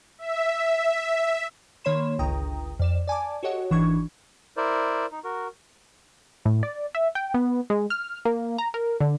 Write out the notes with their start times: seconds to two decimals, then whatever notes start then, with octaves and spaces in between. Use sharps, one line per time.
0.19 E5
1.84 D#3 A#3 C#5 B5 C6 E7
2.19 G1 C#2 G5 A#5 D#6
2.80 F2 D5 E7
3.08 D5 G#5 A5 D6
3.43 F#4 G4 A4 C#5 D#5 F#5
3.71 G#1 E3 D4 C#6 G#6
4.57 E4 A#4 C5 D5
5.12 D#4
5.24 F#4 A#4
6.45 A2
6.63 D5
6.95 E5
7.15 G5
7.34 B3
7.70 G#3
7.90 F6
8.25 A#3
8.58 A#5
8.74 A#4
9.00 D3